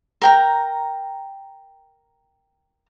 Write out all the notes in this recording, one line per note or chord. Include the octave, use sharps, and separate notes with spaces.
A#4 G5 A#5